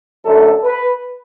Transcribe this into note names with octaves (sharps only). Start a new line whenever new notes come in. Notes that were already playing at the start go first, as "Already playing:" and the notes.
F#2 D3 A3 A4
B4